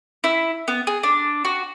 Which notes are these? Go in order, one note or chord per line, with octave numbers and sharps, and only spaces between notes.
E4
B3
G#4
D4
F#4